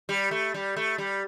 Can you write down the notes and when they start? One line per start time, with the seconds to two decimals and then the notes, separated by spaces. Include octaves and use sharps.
0.09 G3
0.31 A3
0.54 G3
0.76 A3
0.98 G3